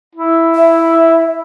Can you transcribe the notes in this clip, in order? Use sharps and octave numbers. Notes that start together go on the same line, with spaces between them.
E4
E5